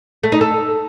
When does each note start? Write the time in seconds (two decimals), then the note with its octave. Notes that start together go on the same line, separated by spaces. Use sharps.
0.23 A3
0.32 D#4
0.41 A4